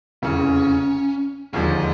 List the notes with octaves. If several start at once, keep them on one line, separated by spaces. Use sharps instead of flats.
F1 E2 C#3 C#4
E1 D#2 D3 F3 G#3